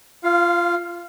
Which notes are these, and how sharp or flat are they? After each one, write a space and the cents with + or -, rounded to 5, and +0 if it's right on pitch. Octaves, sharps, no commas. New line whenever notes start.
F4 -15 F5 +15